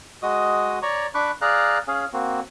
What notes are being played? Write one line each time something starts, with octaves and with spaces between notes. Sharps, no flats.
G#3 F#4 D#5 D#6
C#5 D5 A#5 C#6
D4 B5 C#6 D6 F#6
G#4 D5 F5 A#5 F#6
C#4 G#4 F5
A#3 C4 F#4